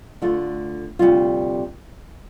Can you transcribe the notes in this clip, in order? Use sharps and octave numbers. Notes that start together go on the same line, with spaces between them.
D3 A3 F4
D2 C3 G3 F4